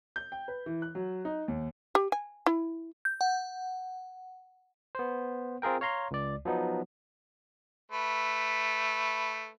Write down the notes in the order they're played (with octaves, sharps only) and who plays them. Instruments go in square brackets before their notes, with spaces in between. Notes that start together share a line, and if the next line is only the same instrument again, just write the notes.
[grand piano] G6
G5
B4
E3
F#6
F#3
D#4
D#2
[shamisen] G4
G#5
E4
[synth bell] G6
F#5
[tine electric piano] B3 C5
C4 F4 G#4 A#4 G5
C#5 F5 A#5 C6
C#2 D5
F3 F#3 B3 D#4
[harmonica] A3 B4